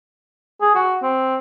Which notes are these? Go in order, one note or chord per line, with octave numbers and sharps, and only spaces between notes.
G#4
F#4
C4